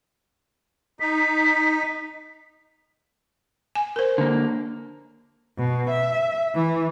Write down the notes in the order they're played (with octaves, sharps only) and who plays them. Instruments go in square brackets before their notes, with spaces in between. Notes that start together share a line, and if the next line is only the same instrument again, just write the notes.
[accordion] D#4 [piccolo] B6
[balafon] G#5
A#4 C5
[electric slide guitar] D3 A#3
[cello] B2
E5
E3